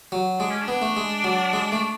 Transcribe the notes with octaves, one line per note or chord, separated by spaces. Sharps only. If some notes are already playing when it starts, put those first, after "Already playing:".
F#3
G#3 D4
C#4
D4
B3
A3
G#3
F#3
G#3
A3